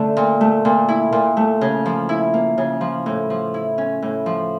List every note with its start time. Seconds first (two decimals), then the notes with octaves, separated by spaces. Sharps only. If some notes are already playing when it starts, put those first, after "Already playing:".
Already playing: D3 A3 C#4
0.17 A#2
0.41 A3
0.65 A#2
0.88 E4
1.12 A#2
1.37 A3
1.61 C#3
1.86 F3
2.09 E4
2.34 A#3
2.58 C#3
2.81 F3
3.06 A2
3.30 F3
3.54 E4
3.78 C#4
4.02 A2
4.26 F3